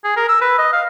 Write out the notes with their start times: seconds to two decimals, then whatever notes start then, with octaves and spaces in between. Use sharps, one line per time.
0.04 G#4
0.16 A#4
0.29 E6
0.41 B4
0.58 D#5
0.73 F5